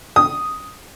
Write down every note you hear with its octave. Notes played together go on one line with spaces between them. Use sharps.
D#6